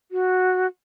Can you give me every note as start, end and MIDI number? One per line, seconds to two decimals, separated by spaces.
0.11 0.67 66